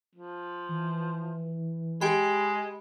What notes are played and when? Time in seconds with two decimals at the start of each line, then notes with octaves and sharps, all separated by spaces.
0.15 F3
0.69 E3
2.01 G#3 G4 G5 B5